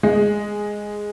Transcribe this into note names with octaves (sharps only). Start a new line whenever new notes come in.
G#3